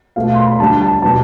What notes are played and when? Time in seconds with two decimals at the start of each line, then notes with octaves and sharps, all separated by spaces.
0.16 B2 A3 F5
0.34 C6
0.46 B5
0.59 D3 G3 A5
0.82 A5
1.02 B2 G3 A5